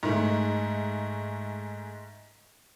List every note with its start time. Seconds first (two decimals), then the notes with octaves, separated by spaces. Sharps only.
0.03 G#2 A3